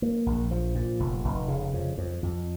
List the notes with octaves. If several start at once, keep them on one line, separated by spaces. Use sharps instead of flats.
A#3
A#1
F3
A#2
F1
F1
C#3
F2
F2
F2